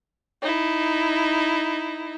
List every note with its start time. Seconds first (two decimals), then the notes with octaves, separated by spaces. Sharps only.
0.42 D#4 E4